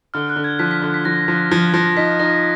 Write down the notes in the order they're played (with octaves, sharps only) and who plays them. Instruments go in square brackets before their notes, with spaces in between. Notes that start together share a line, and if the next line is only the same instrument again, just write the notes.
[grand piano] D3 [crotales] F6
[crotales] F#6
[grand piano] D3
[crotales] G#6
[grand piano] F3 [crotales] B6
[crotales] B6
[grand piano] D3
[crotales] B6
[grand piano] F3 [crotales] A#6
[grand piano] F3
[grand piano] F3 [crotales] G#6
[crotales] G#6
[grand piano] F3 [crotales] A#6
[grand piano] D#4 [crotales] B6
[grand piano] D#4 [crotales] A#6